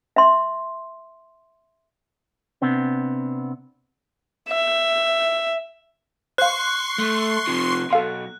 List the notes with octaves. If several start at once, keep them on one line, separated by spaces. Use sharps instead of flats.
E5 C6
C3 B3 C4 D4
E5
C5 F5 C6 C#6 F#6 C7
A3
C3 F3
B1 B2 A4 F5 C6